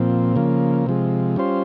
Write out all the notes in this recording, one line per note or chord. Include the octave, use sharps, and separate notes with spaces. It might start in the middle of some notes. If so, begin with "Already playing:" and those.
Already playing: A#2 F3 C4
C#3 F3 A#3
C3 F3 G#3
G3 C#4 F4 C5